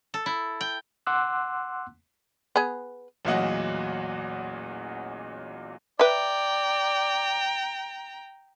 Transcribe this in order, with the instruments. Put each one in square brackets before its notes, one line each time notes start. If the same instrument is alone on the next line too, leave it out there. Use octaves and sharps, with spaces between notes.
[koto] A4
E4
G5
[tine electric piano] F#5 C6 D6 E6 F#6
[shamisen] B3 G#4
[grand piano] A1 E2 A#2 F#3 D#5 F#5
[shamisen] B4 E5 [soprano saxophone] D5 [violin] G5 A#5